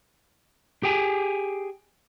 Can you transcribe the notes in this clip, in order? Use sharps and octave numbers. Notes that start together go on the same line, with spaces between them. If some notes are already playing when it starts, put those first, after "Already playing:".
G4 G#4 G5 G#5